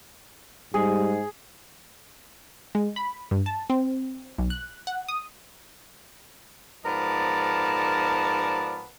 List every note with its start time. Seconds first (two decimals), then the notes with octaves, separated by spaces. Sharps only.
0.74 G#2 G3 G#4
2.75 G#3
2.96 B5
3.31 G2
3.46 A5
3.70 C4
4.38 B1
4.50 F#6
4.87 F#5
5.08 D#6
6.85 G#2 F3 B3 A#4 D5 A5